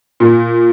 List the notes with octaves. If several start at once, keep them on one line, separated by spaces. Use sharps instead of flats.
A#2